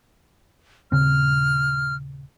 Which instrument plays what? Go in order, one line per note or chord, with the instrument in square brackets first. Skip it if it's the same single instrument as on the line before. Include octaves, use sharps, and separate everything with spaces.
[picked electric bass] D#1 C#3 C4 [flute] F6